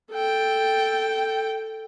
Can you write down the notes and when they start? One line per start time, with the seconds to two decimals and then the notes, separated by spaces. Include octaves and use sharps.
0.12 A4 G5